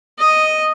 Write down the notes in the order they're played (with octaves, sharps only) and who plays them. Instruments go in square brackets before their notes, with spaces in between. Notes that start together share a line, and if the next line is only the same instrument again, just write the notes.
[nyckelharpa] D#5